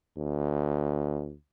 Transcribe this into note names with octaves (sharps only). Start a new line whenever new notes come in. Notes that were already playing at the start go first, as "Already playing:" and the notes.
D2